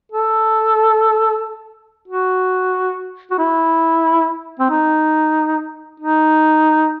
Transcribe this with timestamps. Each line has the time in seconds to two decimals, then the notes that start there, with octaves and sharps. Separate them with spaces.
0.12 A4
2.08 F#4
3.31 F#4
3.39 E4
4.59 C4
4.70 D#4
6.00 D#4